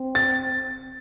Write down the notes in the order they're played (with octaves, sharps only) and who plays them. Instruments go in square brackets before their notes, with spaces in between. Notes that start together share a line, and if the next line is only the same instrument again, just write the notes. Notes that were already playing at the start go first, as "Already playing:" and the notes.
Already playing: [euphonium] C4
[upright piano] A6